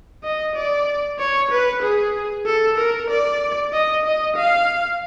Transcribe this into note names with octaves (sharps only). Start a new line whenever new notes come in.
D#5
D5
C#5
B4
G#4
A4
A#4
D5
D#5
D#5
F5